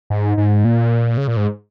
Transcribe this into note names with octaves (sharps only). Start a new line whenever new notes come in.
G#2
G#2
A#2
C#3
A#2
G#2